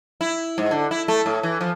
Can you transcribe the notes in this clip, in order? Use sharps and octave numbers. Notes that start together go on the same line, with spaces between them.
E4
G#2
D3
E4
A3
A2
E3
F3